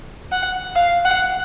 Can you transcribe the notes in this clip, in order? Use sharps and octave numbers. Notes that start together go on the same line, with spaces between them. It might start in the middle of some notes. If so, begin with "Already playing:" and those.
F#5
F5
F#5